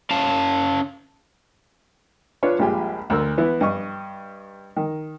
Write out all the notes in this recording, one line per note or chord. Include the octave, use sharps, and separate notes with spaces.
C#4 F5 A5
D4 F4 B4 C#5
A#1 G2 G#3 F4 G4 G#5
D2 A#4 E6
E3 B3 E4
G2 D#5 C#6
D#3